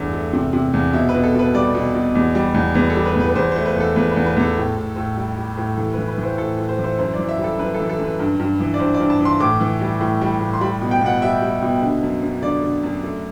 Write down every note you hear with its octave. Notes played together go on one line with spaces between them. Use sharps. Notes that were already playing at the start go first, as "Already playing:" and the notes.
Already playing: E2 G2 A3
A3
C3
C3
E2
B2 E5
B4
B2
A4
B2 B4
G3 D5
B2
B2
E2
G3
E2
E2 B4
A4
G3
B4
E2 B4
B4
E2 C5
A3 C5
B4
E2 A4
E2 B4
E2 B4
B4
E2 A4
A2
A2
A2
G3
G3
A2
E3 A4
B4
E3
B4
E3
C5
A2 A4
A2
C5
E3
C5
F#2 C5
D5
E3
E5
G3
A4
F#2 B4
A4
E3
A4
F#2 B4
G2
G2
E3
D5
G2 C5
D5
G2
A5
E3
C6
A2 D6
E3
G3
A2
G3
A2
C6
G3 B5
B2
G5
B2 F#5
G3 E5
G3
B2
D3
F#2
F#2
D3 D5
D3
F#2
A3